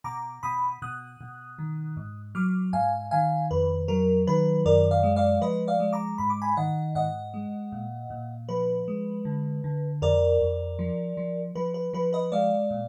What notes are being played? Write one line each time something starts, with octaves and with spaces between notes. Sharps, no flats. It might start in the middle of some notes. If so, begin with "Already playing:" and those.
B2 A#5 D6
B2 B5 D#6
B2 D#6 F#6
B2
D#3
G#2
F#3 D6 F6
G#2 F5 G#5
D#3 F5 G#5
F2 B4
F#3 A#4
D#3 B4
F#2 A#4 D5
D5 F5
G#3
D5 F5
F3 B4 D#5
D5 F5
G#3
A#5 D6
G#2 B5
D6
G#5 B5
D#3 D#5 F#5
G#2 D#5 F#5
G#3
A#2
A#2
F3 B4
G#3
D3
D3
F2 A#4 D5
F2
F3
F3
F3 B4
B4
F3 B4
B4 D#5
G#3 D5 F5
A#2